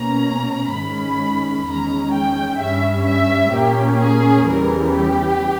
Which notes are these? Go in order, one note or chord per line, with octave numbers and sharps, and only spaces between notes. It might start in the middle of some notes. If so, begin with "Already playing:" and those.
Already playing: B2 A#3 C#4 A#5
G#2 D#3 G#3 C#4 B5
E2 D#3 G#3 C#4 A#5
G5
G2 G3 C#4 E5
E5
A#2 A#3 C#4 G4
G#4
E2 C#3 E3 G3 A#4
G4